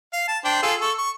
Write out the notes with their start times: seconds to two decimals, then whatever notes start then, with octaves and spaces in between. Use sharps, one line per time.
0.13 F5
0.28 A5
0.45 D4 C5 G5
0.63 F4 G#4 A4
0.81 A4 C#6
0.98 C#6